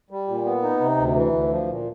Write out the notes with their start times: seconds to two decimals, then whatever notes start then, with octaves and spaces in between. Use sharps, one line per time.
0.11 G3
0.28 A#2
0.45 B3
0.63 D#4
0.80 C3
0.98 D2
1.15 E3
1.32 D2
1.50 F3
1.68 A#2